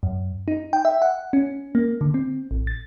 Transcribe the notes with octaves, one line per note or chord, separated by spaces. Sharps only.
F#2
D#4
G5
E5
F#5
C#4
A#3
D3
C4
A1
A6